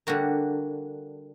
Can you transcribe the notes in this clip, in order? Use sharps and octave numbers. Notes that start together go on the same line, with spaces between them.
D3 G3 A#3 F#4